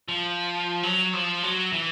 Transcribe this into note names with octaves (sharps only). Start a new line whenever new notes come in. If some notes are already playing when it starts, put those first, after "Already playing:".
F3
F#3
F3
F#3
E3